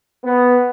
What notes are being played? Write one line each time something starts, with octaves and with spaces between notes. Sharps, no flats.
B3